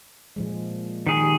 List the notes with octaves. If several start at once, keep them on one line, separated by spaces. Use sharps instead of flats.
A#2 F3 G#3
D#3 G#4
G4